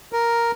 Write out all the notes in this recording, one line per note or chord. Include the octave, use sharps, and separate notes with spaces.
A#4